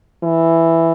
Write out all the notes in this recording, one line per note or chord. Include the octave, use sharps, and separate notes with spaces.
E3